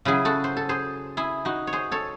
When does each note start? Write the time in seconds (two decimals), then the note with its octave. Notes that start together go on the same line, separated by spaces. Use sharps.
0.05 C#3 F#3 E4 G#4
0.25 F#4 A4
0.44 C5
0.57 A4
0.69 G#4 C5
1.17 E4 G#4
1.45 D#4 F#4
1.67 C#5
1.73 G#4 C5
1.92 A4 C#5